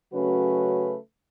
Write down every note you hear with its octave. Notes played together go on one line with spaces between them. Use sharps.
C#3 F#3 A3 C#4 F#4 B4